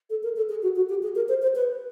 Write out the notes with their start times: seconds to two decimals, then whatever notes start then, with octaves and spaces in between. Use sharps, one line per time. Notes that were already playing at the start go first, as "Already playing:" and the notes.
0.10 A4
0.23 A#4
0.36 A4
0.49 G#4
0.63 F#4
0.76 F#4
0.89 G4
1.03 G#4
1.15 A#4
1.29 C5
1.42 C5
1.55 B4